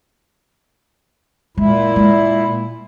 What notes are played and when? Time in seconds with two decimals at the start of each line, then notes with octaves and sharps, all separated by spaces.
1.57 A#2 G#3 E4
1.96 G#3